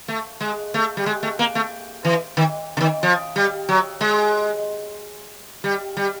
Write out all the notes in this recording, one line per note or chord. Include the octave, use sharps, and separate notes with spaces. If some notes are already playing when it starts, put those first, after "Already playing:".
A3
G#3
A3
G3
G#3
A3
A#3
A3
E3
D#3
D3
D#3
F3
G3
F#3
G#3
G3
G3